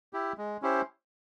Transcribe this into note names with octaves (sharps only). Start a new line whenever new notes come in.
E4 G4
G#3
C#4 E4 G4 C5